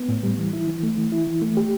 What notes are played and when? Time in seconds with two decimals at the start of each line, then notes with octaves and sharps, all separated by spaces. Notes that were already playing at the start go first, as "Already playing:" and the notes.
Already playing: B3
0.08 A2
0.23 G3
0.38 E3
0.53 E4
0.68 E3
0.83 A3
0.97 E3
1.12 E4
1.27 E3
1.42 A3
1.57 G4